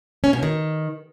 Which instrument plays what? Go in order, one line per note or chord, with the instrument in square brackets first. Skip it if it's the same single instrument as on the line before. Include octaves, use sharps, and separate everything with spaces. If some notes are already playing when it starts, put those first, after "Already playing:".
[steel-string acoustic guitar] C#4
B2
D#3